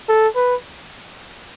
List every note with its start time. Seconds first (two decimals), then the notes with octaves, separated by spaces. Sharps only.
0.08 A4
0.35 B4